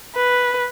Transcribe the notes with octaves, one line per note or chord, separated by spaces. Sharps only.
B4